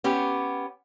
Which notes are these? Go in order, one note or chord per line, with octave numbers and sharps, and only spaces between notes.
B3 C#4 G4